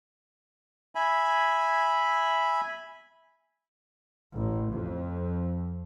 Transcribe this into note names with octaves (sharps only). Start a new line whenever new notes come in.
E5 G#5 B5
A1
F2